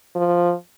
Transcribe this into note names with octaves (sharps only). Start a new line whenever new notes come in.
F3